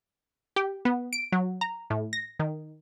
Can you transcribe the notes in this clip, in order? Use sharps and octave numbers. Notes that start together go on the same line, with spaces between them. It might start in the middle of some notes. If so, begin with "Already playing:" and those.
G4
B3
D7
F#3
A#5
A2
A#6
D#3